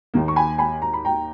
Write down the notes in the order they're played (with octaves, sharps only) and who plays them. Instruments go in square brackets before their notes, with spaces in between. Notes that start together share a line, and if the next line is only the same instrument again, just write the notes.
[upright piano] D#2 D#3 A#3
C#6
G#5 B5
G#5 B5
A#5
B5
G5 A#5